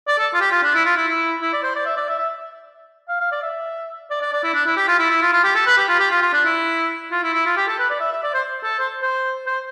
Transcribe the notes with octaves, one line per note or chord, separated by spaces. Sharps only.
D5
A4
F4
G4
F4
D4
E4
F4
E4
E4
E4
D5
C5
D5
E5
D5
E5
E5
F5
F5
D5
E5
D5
D5
D5
E4
D4
E4
G4
F4
E4
E4
F4
F4
G4
A4
B4
G4
F4
G4
F4
F4
D4
E4
F4
E4
E4
F4
G4
A4
B4
D5
E5
E5
D5
C5
A4
C5
C5
C5